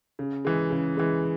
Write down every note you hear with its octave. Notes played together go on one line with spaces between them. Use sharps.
C#3
E3 G#3
C#3
E3 G#3